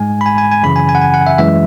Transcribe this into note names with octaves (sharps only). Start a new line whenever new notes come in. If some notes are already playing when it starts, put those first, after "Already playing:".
Already playing: G#2 G#3 G#5
B5
G#5
G#5
G#5
F#2 C#3 E3 B5
G#5
G#5
F#5
G#5
F#5
E5
F#2 E3 G#3 E5